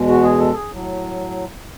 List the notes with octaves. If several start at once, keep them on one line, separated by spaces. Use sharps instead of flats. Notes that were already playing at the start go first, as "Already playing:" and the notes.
Already playing: E2 B2 G#3
F#4
G#4
A4
G#4
A2 F#3